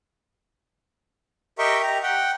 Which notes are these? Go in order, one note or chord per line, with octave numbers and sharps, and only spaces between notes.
G4 A#4 D#5 E5 G5 C#6
G4 A#5
F#5 G5